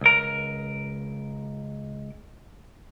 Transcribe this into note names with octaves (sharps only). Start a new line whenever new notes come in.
C#2 A#4